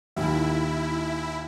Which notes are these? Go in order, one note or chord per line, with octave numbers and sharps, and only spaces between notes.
D#2 A#2 D#3 E4